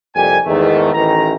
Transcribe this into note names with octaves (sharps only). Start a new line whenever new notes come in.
C2 F2 A#2 G4 G#5
E2 G#2 D#3 A3
A1 D#3 E3 A#5